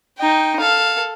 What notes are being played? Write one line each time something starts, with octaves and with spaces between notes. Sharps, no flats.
D#4 G5
A4 F5